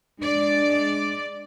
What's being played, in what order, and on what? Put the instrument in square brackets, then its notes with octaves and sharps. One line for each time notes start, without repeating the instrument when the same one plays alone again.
[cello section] G#3 D5 [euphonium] D4